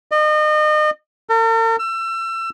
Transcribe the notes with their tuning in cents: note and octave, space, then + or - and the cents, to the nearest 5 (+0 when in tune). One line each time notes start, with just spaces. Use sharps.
D#5 -35
A#4 -45
E6 +30